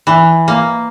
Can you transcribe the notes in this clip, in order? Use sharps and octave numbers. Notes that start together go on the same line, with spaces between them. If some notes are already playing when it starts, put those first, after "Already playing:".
E3
A#3